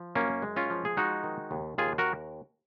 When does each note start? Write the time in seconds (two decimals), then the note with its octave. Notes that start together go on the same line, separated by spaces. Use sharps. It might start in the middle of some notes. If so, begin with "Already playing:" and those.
Already playing: F3
0.15 F#2 A#3 C#4
0.42 G#3
0.56 C#4 F4
0.70 F3
0.85 G#4
0.97 G#3 D#4 F#4
1.24 D#3
1.51 D#2
1.78 D#2 F4 G#4
1.98 F#4 A#4